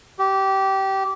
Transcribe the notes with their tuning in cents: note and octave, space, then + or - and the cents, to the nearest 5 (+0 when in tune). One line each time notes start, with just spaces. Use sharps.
G4 -20